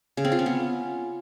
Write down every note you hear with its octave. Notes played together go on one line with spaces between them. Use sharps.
C#3
C4
F4
C#4
B3